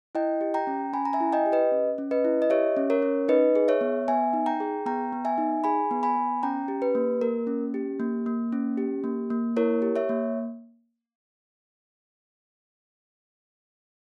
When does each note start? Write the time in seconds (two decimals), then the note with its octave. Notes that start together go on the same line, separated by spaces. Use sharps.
0.15 E4 D#5 G5
0.41 G4
0.54 G5 A#5
0.67 C#4
0.93 C#4 G#5 B5
1.05 A#5
1.13 E5 G#5
1.20 E4
1.33 D#5 G5
1.46 G4
1.52 B4 D#5
1.72 C#4
1.98 C#4
2.11 B4 D#5
2.25 E4
2.42 D#5
2.50 G4 C#5 E5
2.77 C#4
2.90 A#4 C#5
3.02 C#4
3.28 D#4 B4 D#5
3.56 G#4
3.68 C#5 E5
3.81 B3
4.08 B3 E5 G#5
4.33 D#4
4.46 G5 A#5
4.60 G#4
4.86 B3 G5 A#5
5.13 B3
5.25 E5 G#5
5.38 D#4
5.64 G#4 G#5 B5
5.91 B3
6.03 G#5 B5
6.16 B3
6.43 C#4 G5 A#5
6.68 G4
6.82 B4
6.95 A#3
7.21 A#3 A#4
7.47 C#4
7.74 G4
8.00 A#3
8.26 A#3
8.52 C#4
8.78 G4
9.04 A#3
9.30 A#3
9.57 E4 A#4 C#5
9.82 G4
9.96 C#5 E5
10.09 A#3